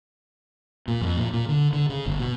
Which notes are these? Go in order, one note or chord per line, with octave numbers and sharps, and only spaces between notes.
A#2
F2
A#2
A#2
D3
D3
C#3
G1
B2